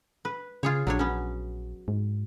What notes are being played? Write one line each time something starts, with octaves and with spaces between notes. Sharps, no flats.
B4
C#3 F4 G#4 C#5
A#1 F#3 D4 C#5
B3 C#4
G#2